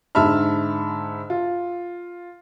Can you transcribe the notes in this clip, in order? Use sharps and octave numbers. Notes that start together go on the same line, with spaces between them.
G#2 D3 E5 A5 B5 F6
F4